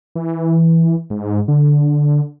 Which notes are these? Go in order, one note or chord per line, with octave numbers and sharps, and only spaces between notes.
E3
G#2
D3